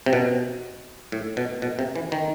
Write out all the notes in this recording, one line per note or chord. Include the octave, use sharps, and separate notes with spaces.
C3
B2
A2
B2
B2
C3
E3
D#3